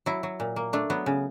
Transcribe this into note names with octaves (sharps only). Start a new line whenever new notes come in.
F#3 E4
F#3
A#2
A#3
A3 D4
F#3 B3
C#3